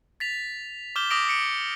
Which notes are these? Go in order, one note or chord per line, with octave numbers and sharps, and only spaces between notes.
A6 B6 F7
D6 F6 G6 E7 G7
D6 D#6 A#6 B6 D7 F7
C#7 D7